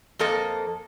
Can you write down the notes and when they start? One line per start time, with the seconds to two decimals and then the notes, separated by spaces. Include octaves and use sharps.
0.19 F2 A#3 A4 D#5